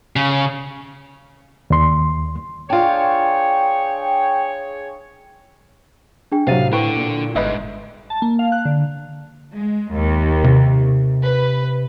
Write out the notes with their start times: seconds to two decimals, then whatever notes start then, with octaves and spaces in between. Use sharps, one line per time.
0.16 C#3
1.70 D#2 C6
2.70 D4 F4 G#4 C#5 G5
6.32 D4 G#4 G5
6.47 A2 C3 F#3 C5 F5 A6 D#7
6.73 D3 E4 B4 G5 C#6
6.96 A#2
7.36 G1 G#2 B4 D#5 E5
8.10 A5
8.22 A#3
8.39 F5
8.52 F#6
8.65 D3
9.54 G#3
9.95 D#2
10.44 C3
11.22 B4